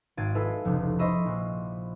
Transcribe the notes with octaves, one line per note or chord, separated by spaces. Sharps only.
G#1 F5 G#6 A6 D7 D#7
E4 G#4 A4 B4 E5 F5
F1 C#2
C5 D#5 E5 B5 C#6 E6
A#1